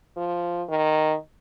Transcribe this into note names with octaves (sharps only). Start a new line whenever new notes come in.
F3
D#3